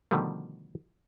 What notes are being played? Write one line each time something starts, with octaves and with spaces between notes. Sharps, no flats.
B2 D3 D#3 F3 G3 A3